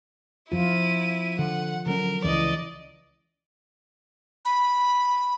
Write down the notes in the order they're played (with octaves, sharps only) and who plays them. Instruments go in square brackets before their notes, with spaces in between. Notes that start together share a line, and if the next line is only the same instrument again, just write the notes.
[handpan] F3 F4 [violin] E4 D#7
[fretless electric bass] D3 [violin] F#5
[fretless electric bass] D3 F#3 C#4 [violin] A#4
[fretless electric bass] C#2 [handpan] E3 [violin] D5 D#5
[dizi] B5